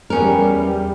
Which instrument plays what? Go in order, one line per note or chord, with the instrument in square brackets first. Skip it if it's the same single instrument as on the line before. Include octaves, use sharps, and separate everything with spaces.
[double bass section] E2 G3 [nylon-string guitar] B3 C#4 A#4